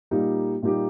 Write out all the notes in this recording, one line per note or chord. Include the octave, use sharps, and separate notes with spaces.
A#2 G3 A#3 D#4 G4
A#2 G3 A#3 D#4 G4